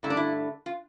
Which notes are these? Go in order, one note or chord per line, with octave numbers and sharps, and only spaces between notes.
G2 D3 A3 E4
D4
E4
F4